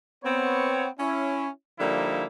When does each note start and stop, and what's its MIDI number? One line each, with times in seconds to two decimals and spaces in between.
0.24 0.87 59
0.24 0.87 60
0.24 0.87 73
0.99 1.48 61
0.99 1.48 64
1.80 2.25 50
1.80 2.25 53
1.80 2.25 55
1.80 2.25 58
1.80 2.25 63
1.80 2.25 64